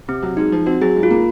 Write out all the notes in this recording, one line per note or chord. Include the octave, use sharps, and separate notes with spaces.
C3 C4
F#3
G#3 D#4
F3
C4 F#4
F#3 G#4
G#2
F4
A#3